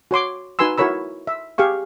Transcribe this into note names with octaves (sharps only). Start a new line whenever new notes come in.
F#4 C#5 C6 D6
D#4 F#4 B4 G#5 C6 E6
E4 F#4 A#4 C#5 B5 E6
E5
G4 G#4 F5 C#6